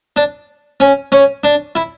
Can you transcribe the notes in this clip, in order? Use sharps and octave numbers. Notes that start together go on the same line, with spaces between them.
D4
C#4
C#4
D4
E4